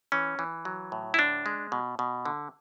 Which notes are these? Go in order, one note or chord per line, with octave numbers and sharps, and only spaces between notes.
E3 C#4
E3
F#3
A2
E4
D3 D4
G#3
B2
B2
D3